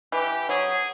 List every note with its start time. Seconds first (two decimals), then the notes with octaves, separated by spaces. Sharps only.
0.12 E3 G4
0.49 F#3 G#4